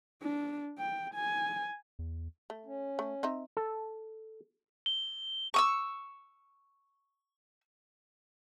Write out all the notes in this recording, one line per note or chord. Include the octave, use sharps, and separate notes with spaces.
D4
G5
G#5
E2
A3
C#4
A3
C4 D#4 E5
A4
G7
C#6 D#6 E6